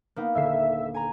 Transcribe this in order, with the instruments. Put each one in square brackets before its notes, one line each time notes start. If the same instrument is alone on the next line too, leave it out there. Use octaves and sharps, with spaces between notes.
[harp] A#3 B3 D#4
[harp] D#1 D3 C7 [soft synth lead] E5
[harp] G#5 A#5